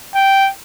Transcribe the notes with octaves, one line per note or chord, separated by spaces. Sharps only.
G5